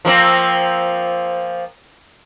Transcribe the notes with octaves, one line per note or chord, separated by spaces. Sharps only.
F3 A#3 C4